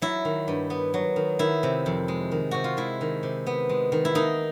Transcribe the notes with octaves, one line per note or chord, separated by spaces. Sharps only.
F#3 E4
D#3
G2
B3
F#3
D#3
D#3 E4
C3
F2
G#3
D#3
C3 F#4
F4
G#3 E4
D#3
C3
B3
G#3
D#3
E4
A#3 D#4